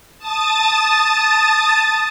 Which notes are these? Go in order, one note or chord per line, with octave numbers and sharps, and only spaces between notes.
A5 D#6 A6